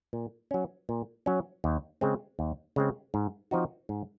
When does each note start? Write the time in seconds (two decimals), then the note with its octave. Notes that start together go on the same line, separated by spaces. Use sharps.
0.13 A#2
0.51 F#3 C#4
0.89 A#2
1.26 F#3 C#4
1.64 D#2
2.01 C#3 G#3 C4
2.39 D#2
2.76 C#3 G#3 C4
3.14 G#2
3.51 F3 C4 D#4 F#4
3.89 G#2